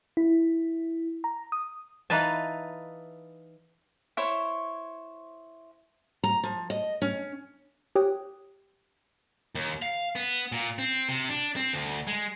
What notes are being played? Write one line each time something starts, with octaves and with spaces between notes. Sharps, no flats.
E4
A#5
D#6
E3 D#4 B4 F5 A5
E4 C5 C#5
A#5
F3
D#5
C#4
G4 C#5 G5 D#6 F#6
D#2
F5
B3
A#2
C4
C3
D4
C4
D2
G#3